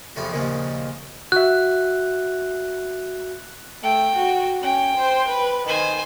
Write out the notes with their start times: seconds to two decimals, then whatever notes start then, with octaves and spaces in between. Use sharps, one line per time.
0.16 E2 A2 C3 F3 B3 F5
0.32 D#2 A#2 C#3 F3 G#3
1.32 F#4 E5 F#6
3.83 A3 G5
4.17 F#4
4.62 C#4 G5
4.97 C5
5.28 B4
5.68 D#3 C5 G#5